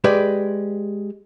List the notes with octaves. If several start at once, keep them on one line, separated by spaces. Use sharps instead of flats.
G#3 G4 B4 D5